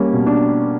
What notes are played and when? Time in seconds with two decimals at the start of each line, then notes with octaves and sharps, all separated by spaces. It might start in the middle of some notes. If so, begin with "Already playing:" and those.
Already playing: G3 A#3 C#4
0.13 B2
0.27 D4